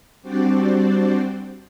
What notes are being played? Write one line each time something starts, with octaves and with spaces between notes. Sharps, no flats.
G3 C4 D4 F#4 C5 D5